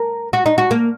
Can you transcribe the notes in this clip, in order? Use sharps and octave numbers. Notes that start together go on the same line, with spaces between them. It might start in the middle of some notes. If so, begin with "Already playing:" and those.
Already playing: A#4
F#4
D#4
F#4
A#3